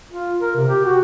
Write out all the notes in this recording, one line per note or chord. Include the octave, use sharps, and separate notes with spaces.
F4
A#4
C3
G4
F#4